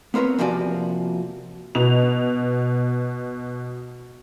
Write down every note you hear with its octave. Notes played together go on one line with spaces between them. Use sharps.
B3 C4 A#4 B4 C#5
C3 F3 A#3 F#4 D5 G#5
B2 F7